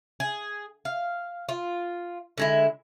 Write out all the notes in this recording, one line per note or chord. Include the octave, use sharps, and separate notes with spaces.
G#4
F5
F4
D3 G#3 E4